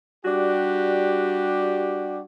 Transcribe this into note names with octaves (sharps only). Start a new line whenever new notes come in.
G3 D4 F#4 G4